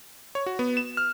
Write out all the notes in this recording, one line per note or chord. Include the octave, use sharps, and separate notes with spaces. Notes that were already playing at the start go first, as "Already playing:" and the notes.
C#5
F#4
B3
E7
F6